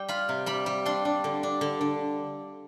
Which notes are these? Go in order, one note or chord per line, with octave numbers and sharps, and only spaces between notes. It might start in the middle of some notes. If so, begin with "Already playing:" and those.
Already playing: G3 G5
F4 B5
C3
G3 B5
G3
D4 C6
D4
D3
D4
D3
D3